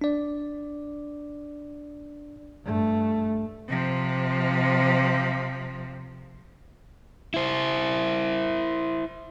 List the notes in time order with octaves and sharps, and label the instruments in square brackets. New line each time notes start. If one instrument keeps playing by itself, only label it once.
[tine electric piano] D4 D5
[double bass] G2 A3
[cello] C3 F3
[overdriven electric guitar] E4 C5